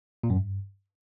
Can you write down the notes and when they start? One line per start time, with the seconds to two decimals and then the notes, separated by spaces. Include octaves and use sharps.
0.23 A#2
0.30 F#2
0.36 G2